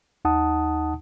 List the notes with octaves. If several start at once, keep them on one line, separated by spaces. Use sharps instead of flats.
D#2 D#4 F#5 A5 D#6